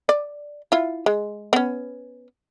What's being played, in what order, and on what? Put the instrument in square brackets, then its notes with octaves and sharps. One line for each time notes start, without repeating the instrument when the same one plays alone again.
[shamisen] D5
E4 F4
G#3
B3 C#4